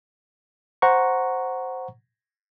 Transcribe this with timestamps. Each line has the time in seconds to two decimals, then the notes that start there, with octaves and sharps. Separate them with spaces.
0.82 C5 F#5 A#5 C#6